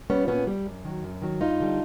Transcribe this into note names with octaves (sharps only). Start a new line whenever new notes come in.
G3 B3 C#4
A#2 B3 C#4
G3
F#2
D#3 F#3
F#2
D#3 F#3
G2 D#4 F4
D3 G3